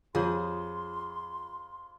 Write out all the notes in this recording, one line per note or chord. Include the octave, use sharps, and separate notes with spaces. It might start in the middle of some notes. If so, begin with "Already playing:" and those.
F2 F4 G#4 C#5 C6